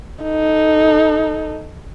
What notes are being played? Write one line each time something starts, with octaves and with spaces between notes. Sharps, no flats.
D#4 A4